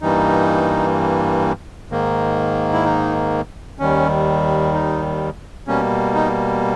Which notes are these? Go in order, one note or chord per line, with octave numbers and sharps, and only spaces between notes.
G2 E3 G3 A#3 D#4
G#2 D#3 A#3
E4
D#4
D#2 D#3 G3 C#4
D#4
B2 G3 A#3 C#4
D#4